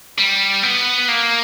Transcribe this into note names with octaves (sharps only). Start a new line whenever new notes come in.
G3
B3
A#3